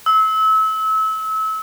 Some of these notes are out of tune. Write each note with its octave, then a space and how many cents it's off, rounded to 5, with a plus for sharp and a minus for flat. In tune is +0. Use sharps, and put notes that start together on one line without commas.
E6 -30